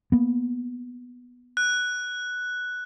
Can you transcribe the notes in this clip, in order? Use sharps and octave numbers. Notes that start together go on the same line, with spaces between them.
A#3 B3
F#6